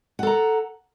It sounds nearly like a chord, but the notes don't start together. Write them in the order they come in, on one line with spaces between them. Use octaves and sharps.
F#5 A4 A#5